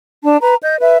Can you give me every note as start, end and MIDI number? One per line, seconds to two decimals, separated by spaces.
0.24 0.38 62
0.24 0.38 81
0.40 0.55 71
0.40 0.55 82
0.63 0.75 75
0.63 0.75 91
0.80 0.97 71
0.80 0.97 76